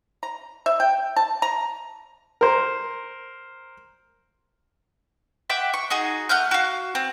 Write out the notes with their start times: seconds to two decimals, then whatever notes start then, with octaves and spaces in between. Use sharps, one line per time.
0.23 A#5
0.66 E5
0.80 G5
1.16 A5
1.42 A#5
2.41 A#4 C5
5.50 E5 F#5 G5 D6
5.74 C#6
5.90 D#4 F#4 G#4
6.29 A3 F#5 F6 G6
6.51 F#4 F5
6.95 C4